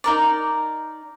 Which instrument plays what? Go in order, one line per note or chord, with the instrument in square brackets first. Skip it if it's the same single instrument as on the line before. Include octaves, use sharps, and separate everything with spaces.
[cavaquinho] D#4 A#4 D5